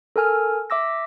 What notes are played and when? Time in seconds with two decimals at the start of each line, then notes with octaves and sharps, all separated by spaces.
0.16 A4 A#4 G#5 F6
0.70 E5 D6 E6 A#6